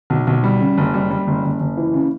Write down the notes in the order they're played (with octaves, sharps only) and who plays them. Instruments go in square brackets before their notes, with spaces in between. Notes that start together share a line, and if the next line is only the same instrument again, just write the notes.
[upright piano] B1
B1
G3
C#3
F#1
G3
G3
F#1
F#1
F#1
E3
C#3